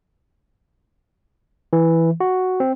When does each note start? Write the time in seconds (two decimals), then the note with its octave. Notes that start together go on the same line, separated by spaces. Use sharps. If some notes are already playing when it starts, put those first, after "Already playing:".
1.73 E3
2.20 F#4
2.60 C4